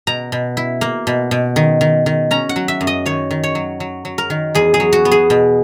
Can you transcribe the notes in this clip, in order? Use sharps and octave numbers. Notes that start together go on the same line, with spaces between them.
B2 A#5
B2
E4
A#3
B2
B2
D#3
D#3
D#3
C#4 A#5
F#5
F#3
E5
F#2
D#5
D#3 C#5
D#3
C#5
F#3
F#3
F#3
A#4
D#3
E2 G#4
G#4
F#3
F#4
B3
G#4
B2